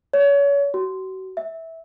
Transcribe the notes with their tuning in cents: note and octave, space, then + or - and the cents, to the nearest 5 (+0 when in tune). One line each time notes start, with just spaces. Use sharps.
C#5 +30
F#4 +35
E5 -15